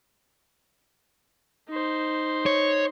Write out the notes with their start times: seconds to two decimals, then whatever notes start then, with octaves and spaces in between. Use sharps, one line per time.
1.69 D#4 C5
2.46 C#5